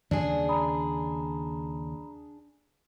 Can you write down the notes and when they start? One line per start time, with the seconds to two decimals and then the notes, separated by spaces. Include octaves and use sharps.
0.11 D#2 C#3 F#3 D4 G#4
0.49 A#5 B5 D#6